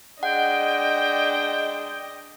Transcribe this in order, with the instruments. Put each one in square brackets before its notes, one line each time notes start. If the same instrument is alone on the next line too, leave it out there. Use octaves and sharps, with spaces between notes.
[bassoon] G#3 [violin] D4 D#5 [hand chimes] F#5 [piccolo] G5